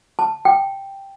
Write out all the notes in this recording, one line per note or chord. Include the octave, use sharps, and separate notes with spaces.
A5
G5